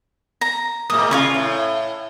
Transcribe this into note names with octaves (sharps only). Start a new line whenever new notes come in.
A#5
A2 G#3 A#3 D#6
C3 F4 F5 G#5 C#6
A2